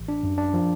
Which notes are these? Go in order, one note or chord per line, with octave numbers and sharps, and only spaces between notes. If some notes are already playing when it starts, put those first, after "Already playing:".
Already playing: A1
D4
F#2
D4
F3